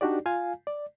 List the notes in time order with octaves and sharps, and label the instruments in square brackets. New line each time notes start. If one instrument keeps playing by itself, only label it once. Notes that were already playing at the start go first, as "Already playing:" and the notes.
[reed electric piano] D4 D#4 F#4 G4 D5
F4 F5 G#5
D5